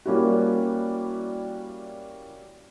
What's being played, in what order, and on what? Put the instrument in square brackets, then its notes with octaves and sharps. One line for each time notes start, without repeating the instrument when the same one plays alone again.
[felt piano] G3 A#3 C#4 E4 F#4